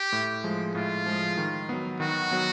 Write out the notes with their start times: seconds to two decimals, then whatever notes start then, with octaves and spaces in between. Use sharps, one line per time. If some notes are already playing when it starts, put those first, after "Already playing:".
Already playing: G4
0.12 A2
0.44 F3 G#3
0.75 A2 F4
1.06 F3 G#3
1.37 D#3
1.69 F#3 B3
2.00 D#3 F#4
2.31 F#3 B3